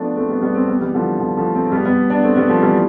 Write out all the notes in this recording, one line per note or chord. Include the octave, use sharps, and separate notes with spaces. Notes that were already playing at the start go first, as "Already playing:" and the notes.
Already playing: F3 A3 B3 D4
A3 C4
G3 B3
G3 B3
A3 C4
G3 B3
E3 G3
D3 F3
D3 F3
F3 A3
A3 C4
C4
G3 B3
G3 B3
B3 D4
A3 C4
G3 B3
F3 A3
E3 G3